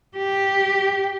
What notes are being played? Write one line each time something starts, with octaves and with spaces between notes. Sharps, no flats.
G4